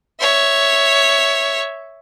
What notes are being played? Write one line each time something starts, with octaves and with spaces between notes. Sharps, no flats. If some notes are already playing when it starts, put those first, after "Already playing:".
C#5 E5